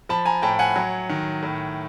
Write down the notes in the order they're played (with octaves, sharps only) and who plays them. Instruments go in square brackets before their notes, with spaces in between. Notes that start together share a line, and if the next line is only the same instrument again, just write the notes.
[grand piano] F3 A5 B5
G#5 A#5
A2 G5 A5
F#5 G#5
F#3
D#3
A2